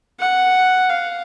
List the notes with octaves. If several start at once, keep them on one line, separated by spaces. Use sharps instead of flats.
F#5
F5